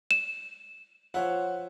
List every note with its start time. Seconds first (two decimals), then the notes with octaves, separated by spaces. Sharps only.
0.11 E7
1.14 F3 C5 C#5 E5 F#5